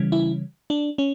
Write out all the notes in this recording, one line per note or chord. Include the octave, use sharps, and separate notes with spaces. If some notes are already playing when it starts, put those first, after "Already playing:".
Already playing: C#3 E3 G3 C#4
E4
D4
C#4